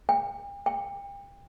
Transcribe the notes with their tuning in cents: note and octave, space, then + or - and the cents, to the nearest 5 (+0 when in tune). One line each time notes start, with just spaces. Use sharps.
G5 +45
G5 +35